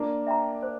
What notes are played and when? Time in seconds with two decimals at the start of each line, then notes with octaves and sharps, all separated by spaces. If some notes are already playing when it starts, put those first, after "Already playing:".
Already playing: A#3 D4
0.27 E5 G5 A#5
0.62 C5